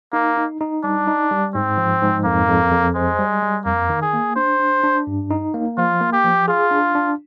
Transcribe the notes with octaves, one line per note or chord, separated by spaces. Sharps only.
A#3 D#4
D#4
D#4
G3 D4
D#4
G3
G#2 C4
F3
G#2
F2 A#3
F2
F2
G#3 C5
G3
G3
F2 A#3
D#3
G#4
A#3
D4 C5
D4
D4
G2
D#4
A#3
F3 F4
A#3
G4
F3
F4 G#4
D4
D4